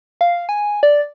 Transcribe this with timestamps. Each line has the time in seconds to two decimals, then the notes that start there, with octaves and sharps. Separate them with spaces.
0.21 F5
0.49 G#5
0.83 D5